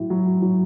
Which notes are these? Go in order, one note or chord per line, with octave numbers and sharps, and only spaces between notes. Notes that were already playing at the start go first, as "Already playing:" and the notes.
Already playing: A2 F#3
F#3
F#3